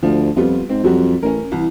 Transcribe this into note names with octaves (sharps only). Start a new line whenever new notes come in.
D2 F3
F2 G3 B3 F4
G#2 C4
F2 F#3 G3 F#4
A1 C#4 A#4
C2 E3